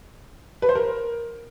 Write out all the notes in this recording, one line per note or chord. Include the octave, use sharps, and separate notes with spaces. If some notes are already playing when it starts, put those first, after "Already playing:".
B4
C5
A#4